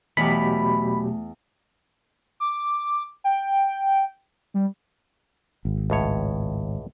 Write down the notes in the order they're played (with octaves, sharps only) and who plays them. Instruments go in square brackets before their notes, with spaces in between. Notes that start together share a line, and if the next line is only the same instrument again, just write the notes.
[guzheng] E2 [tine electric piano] B2 F#3 G4 [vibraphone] A3 [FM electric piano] B5
[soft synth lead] D6
G5
G3
[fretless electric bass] G#1
[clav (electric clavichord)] C#2 A2 C#5